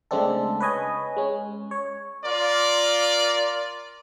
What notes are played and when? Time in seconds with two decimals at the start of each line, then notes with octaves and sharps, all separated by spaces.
0.11 C#3 G#3 A3 C4 D4 A4
0.60 B4 C#5 D#5 G#5
1.16 G#3 C#4
1.71 C#5
2.24 F4 A#4 D5